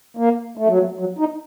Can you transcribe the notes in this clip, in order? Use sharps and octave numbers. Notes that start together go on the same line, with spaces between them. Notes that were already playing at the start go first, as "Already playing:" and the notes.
A#3
A3
F#3
A3
F#3
D#4